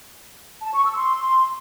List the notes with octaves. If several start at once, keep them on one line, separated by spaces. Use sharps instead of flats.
A5
C#6
E6
C6